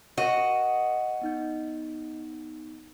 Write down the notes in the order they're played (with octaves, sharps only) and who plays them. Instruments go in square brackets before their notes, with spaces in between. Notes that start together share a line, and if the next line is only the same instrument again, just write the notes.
[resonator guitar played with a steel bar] F#4 [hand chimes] A#4 [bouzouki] D#5
[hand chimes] B3 D#4 G6